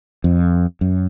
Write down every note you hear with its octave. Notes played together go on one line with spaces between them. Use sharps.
F2
F#2